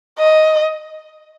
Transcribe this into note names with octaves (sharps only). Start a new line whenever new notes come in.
D#5